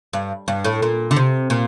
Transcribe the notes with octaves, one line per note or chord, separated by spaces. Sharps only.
G2
G2
A2
A#2
D3
C3
A#2